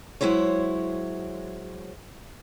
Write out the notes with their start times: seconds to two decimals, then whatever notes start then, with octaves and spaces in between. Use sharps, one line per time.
0.21 F#3 G#3 E4 C5 C#5